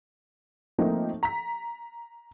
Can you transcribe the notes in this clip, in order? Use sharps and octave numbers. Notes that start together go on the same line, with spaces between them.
F3 A3 A#3 C4 D#4
A#5 B6